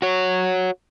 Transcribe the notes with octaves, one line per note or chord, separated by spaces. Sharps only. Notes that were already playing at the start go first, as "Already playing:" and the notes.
F#4 C#5